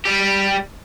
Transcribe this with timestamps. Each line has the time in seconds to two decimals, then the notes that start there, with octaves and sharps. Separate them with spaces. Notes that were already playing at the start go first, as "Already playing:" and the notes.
0.05 G3 G4